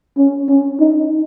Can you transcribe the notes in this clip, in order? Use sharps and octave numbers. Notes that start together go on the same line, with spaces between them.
C#4
C#4
D#4